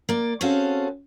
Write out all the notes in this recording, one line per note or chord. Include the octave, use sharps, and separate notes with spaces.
A#3 D5
C4 C#4 F#4 G#4 A4 F5